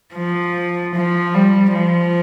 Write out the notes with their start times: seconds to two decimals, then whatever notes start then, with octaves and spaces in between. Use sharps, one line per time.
0.15 F3
0.95 F3
1.34 G3
1.74 F3